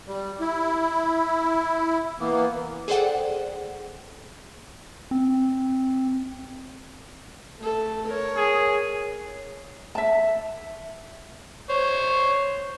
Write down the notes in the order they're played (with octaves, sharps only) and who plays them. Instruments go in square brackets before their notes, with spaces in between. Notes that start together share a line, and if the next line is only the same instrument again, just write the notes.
[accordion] G3
E4
E3 A#3 B3
[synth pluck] G#4 A4 C5 D5 F#5 G5
[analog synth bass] C4
[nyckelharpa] A3 A4
A#4 C#5
[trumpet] G#4
[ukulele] E5 A5
[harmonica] C5 C#5